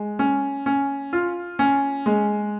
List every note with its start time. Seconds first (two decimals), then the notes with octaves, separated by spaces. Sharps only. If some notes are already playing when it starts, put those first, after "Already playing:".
Already playing: G#3
0.19 C#4
0.66 C#4
1.13 F4
1.59 C#4
2.06 G#3